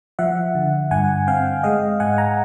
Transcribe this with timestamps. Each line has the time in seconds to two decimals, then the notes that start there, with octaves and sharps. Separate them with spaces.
0.19 F3 E5 F#5
0.55 D3
0.91 G2 F#5 G#5
1.27 C4 F5 G5
1.63 G#3 D#5 F5
2.00 G#2 F#5 G#5
2.18 G#5 A#5